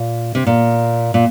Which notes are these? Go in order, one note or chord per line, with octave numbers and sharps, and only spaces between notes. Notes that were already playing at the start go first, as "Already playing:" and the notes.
Already playing: A#2
C3
A#2
A#2